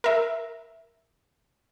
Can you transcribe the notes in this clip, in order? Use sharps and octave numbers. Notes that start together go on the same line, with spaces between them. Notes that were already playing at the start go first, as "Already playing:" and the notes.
A#4 E5